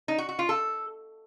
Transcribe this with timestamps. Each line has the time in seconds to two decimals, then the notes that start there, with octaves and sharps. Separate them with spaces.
0.08 D#4
0.18 F#4
0.29 F#4
0.39 F4
0.49 A4